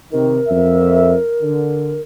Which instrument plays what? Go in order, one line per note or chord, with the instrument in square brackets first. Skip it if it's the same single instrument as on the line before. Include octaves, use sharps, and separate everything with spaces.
[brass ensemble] C3 D#3 [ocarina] A#4
[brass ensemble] F2 E5
D3